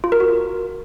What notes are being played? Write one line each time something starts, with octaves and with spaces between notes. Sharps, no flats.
F4
A#4
F#4